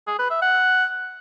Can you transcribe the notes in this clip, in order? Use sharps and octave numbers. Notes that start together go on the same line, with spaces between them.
G#4
B4
E5
F#5